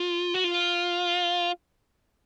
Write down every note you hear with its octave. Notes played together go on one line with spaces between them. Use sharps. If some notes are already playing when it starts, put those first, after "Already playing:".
Already playing: F4
F#4
F4